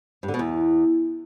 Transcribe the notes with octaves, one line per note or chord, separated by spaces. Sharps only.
G2
D3
B2
E2